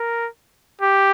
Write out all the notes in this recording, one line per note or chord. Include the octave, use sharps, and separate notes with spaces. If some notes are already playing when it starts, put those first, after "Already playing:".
Already playing: A#4
G4